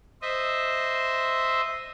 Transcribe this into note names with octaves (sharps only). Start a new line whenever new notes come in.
C5 D#5 E5